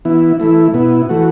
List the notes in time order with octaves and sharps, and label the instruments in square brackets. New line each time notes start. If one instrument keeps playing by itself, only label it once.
[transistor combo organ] E3 B3 E4
E3 A3 E4
B2 B3 E4
E3 A3 F#4